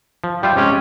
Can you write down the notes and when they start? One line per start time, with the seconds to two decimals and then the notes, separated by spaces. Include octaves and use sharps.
0.24 F3
0.43 G3 F4 E5 G5
0.56 C3 G#3 C#4 G4